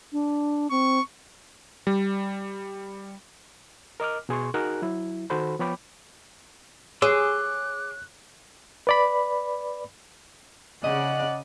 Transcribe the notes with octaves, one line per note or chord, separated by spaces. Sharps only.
D4
C4 C#6
G3
A#4 D#5 D6 F6
B2 G#4 C6 C#6
D#4 F#4 G#4 A#4 F#6
F#3 E4
D#3 F#4 A4 C5 B5
F3 B3 C#5 G5 B5 D6
G#4 C#5 C6 D6 E6 F#6
B4 D5 B5
C#3 D5 D#5 F#5